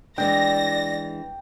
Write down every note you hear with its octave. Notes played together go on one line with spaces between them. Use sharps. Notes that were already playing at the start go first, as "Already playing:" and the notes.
E3 G#3 D4 D5 G5 A#6